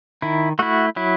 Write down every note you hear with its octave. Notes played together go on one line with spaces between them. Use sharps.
D#3 E4
A3 E4 F#4
F#3 E4